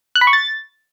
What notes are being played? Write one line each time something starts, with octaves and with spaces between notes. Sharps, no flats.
F#6
B5
C#6
A6